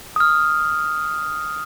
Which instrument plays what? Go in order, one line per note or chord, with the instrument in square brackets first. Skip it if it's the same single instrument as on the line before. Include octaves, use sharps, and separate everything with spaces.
[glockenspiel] D#6 F6